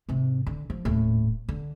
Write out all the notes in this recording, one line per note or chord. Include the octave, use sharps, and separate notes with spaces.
G#2 C3
D3
F3
D#1 A2
D3